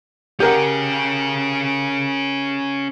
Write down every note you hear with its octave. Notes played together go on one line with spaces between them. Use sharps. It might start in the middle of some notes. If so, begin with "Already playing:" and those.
C#4 G4 G#4 A#4 F#5